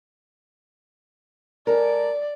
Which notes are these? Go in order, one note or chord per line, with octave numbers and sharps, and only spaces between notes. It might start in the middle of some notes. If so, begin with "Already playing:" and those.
G#3 A4 A#4 D5